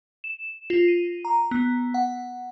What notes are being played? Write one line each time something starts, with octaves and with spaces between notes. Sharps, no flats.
E7
F4
D#7
A#5
B3
F#5